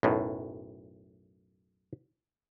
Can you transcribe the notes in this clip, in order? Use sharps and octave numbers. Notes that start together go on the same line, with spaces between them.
B1 F#2 A2